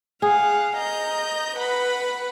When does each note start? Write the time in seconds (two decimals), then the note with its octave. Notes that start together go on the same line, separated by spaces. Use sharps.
0.22 G#4 F5 F#5
0.76 D#5 A#5 G6
1.56 B4 F#5 B5